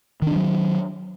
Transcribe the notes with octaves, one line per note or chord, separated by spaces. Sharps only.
D#3 F3 F#3 D4